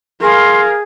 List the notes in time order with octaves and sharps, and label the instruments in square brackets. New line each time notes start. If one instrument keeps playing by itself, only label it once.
[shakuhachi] G#4 [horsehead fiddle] A#4 F5 [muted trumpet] C6